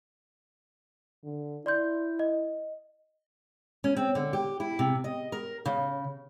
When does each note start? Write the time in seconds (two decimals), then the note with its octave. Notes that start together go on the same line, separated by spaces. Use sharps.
1.23 D3
1.66 E4 D5 C6 G6
2.19 D#5
3.84 C#4
3.97 C4
4.15 D3
4.33 G4
4.60 E4
4.79 C3
5.04 D#5
5.32 A#4
5.65 C#3